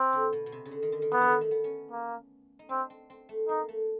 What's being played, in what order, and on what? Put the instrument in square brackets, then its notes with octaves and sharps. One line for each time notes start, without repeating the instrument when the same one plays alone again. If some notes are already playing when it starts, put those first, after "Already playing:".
Already playing: [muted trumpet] C4
[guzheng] D3
B2
B2
C3
C#3
D3
D#3
D3
D#3
[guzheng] E3 [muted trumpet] B3
[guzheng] D3
D#3
A3
B3
C#4
[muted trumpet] A#3
[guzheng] D#4
[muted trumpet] C4 [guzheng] D4
[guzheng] C4
C4
A3
[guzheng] A#3 [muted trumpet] D#4
[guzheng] A3